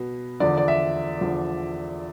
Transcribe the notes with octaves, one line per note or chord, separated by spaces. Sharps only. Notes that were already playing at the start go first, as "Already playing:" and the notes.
Already playing: B2 B3
E2 D3 F3 D5
D5
E5
E2 D3 F3